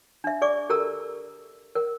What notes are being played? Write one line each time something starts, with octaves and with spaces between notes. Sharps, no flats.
D4 E5
G#4 D5 C#6 D6
G4 A4 A#4 A#5 E6
A#4